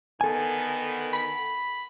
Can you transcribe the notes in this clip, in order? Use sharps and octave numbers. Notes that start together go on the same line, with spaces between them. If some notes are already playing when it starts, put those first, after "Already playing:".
D3 D#3 B3 A4 G#5
B5